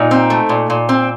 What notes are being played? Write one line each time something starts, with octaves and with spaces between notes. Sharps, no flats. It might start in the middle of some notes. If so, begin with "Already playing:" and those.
Already playing: A#2 D#4
C4
A3
A#2
A#2
C4